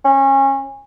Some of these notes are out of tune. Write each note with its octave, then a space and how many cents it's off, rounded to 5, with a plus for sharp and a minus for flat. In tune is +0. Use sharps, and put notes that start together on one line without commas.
C#4 -25